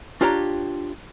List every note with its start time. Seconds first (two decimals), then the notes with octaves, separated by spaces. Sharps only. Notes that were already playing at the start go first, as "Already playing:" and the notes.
0.21 D4 F4 G4 C#5 A#5